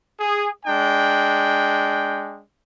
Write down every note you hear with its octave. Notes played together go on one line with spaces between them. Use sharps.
G#4
G#3 D4 G5